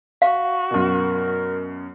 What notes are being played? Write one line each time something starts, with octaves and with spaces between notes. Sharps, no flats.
F#4 F5
F#2 B2 A#4